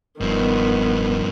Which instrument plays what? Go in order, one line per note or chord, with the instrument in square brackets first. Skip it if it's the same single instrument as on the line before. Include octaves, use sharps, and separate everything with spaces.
[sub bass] F1 [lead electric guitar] G2 F3 [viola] D#3 B3